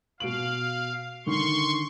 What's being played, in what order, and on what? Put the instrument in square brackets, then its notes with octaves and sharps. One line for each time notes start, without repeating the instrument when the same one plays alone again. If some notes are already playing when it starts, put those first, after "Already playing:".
[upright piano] B2 D7 F#7 [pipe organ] F5
[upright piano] D3 D#3 [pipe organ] C6 C#6